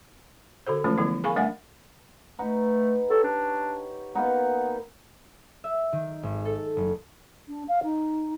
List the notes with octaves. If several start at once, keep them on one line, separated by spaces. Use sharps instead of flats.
D3 F#4 A4 C5
E3 F3 G#3 A3 C#4 F4
D3 F3 G3 B3 E4
G#4 A#4 F5 G#5 B5 C#6
G3 A3 D4 E5 F#5 G#5
A3 D#4 B4 F#5
G4 A4 C#5
D4
A#3 B3 D#4 F#5
E5
D#3
G#1
A4
F#1
D4
F5
D#4